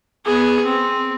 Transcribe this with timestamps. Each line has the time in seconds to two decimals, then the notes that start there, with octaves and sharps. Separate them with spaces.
0.25 B3 G#4
0.64 C4